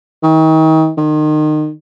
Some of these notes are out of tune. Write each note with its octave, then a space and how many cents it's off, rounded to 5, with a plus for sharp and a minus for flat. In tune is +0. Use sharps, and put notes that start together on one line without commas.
D#3 +35
D#3 -30